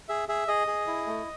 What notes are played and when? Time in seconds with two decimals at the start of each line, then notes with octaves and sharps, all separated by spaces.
0.09 G#4 E5
0.29 G#4 E5
0.48 G#4 D#5
0.67 G#4
0.87 E4
1.07 A3